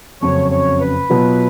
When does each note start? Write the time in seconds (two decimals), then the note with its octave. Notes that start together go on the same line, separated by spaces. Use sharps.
0.21 F#1 F2 C#3 F#3 C#4 C#5
0.51 C#5
0.80 B4
1.10 B2 F#3 B3 F4